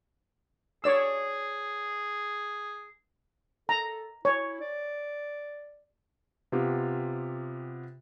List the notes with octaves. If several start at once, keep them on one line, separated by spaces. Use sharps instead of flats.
G#4 C#5 D5 E6
A4 A#5
E4 C#5
D5
C3 B3 F4 G4